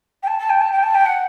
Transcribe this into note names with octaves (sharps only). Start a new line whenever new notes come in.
G5
A5
A5
G5
A5
G5
A5
G5
F#5